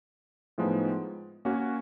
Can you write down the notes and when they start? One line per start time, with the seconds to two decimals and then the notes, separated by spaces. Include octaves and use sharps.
0.58 A2 F3 G#3 B3 D#4
1.45 A#3 C#4 F#4